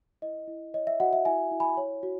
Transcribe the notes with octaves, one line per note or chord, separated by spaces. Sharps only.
E4 D#5
E4
C#5 D#5
E5
F#4 D#5 F#5
E5
E4 E5 G#5
E4
G#5 B5
C#5
F#4